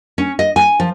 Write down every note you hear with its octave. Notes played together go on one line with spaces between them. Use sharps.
C#4
D#5
G#5
F3